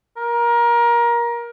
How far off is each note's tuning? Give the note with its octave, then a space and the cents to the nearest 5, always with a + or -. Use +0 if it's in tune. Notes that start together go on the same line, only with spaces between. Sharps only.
A#4 +25